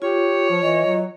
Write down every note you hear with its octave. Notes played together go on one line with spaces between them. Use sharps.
F4 G4 C#5
F3
E3 D#5
F#3